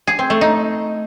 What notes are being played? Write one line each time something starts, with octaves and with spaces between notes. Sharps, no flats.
G#4
C4
A3
D#4